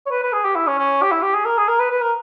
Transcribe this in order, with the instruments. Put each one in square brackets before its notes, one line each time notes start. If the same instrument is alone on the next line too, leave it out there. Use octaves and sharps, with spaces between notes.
[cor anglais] C#5
B4
B4
G#4
G4
E4
C#4
C#4
G4
E4
G4
G#4
A#4
G#4
A#4
B4
B4
A#4